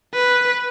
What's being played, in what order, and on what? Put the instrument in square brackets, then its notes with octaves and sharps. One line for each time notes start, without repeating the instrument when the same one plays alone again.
[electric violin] B4